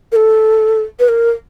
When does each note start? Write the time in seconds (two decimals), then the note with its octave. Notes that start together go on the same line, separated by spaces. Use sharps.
0.12 A#4
0.16 A4
1.00 B4
1.09 A#4